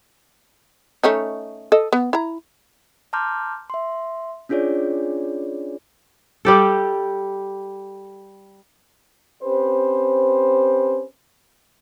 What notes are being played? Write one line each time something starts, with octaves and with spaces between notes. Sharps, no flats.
A3 C#4 D#4
A4 D#5
B3
E4 A#5
A5 A#5 C6 D6 F6 G6
E5 C6
C#4 D4 F4 G#4 C#5 D5
G3 G4 A4
C4 C#4 G4 B4 C5